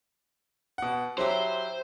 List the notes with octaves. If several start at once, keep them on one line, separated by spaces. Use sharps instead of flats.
B2 F#5
F#3 E4 G4 C5